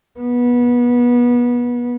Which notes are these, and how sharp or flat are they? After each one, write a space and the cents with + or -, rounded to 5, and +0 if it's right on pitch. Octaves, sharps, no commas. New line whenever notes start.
B3 -25